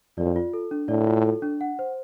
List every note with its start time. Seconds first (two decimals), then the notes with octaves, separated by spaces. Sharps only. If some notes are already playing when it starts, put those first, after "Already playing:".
0.17 F2 D5
0.36 F4
0.54 A4
0.71 D4
0.89 A2 D5
1.07 F4
1.25 A4
1.42 D4
1.61 F#5
1.79 C5